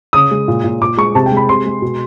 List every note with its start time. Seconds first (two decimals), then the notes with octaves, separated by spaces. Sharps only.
0.13 C#3 D#6
0.31 G#3
0.48 A#2
0.64 A#2
0.81 A#2 D6
0.97 G#3 C#6
1.15 C3 A5
1.26 G5
1.32 G#3
1.37 B5
1.49 C3 C6
1.66 G#3
1.82 B2